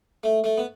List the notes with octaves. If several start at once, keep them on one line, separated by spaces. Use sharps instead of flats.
A3
A3
B3